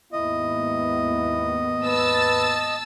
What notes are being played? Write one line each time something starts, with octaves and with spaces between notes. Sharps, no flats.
D#2 G#2 B3 E4 D#5
B4 A5 E6 A6